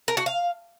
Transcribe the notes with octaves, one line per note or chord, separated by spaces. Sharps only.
A#4
F#4
F5